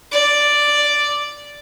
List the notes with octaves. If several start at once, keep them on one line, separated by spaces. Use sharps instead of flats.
D5